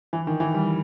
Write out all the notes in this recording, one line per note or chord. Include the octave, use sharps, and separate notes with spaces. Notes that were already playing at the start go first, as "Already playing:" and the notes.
E3
D#3
E3
G3